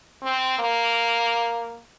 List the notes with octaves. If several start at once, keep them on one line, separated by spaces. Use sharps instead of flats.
C4
A#3